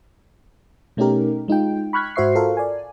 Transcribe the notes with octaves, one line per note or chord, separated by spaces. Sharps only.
B2 A3 C#4 D#4 G4 A#4
G#3 D#4 F4 G5
B5 C#6 F6 F#6 G#6 B6
G#2 F#4 C5 E5 C#6 C7
F4 F#4 A4 A#4 C5 F5
D5 G#5